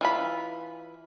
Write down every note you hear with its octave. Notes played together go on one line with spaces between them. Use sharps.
E3 F4 B5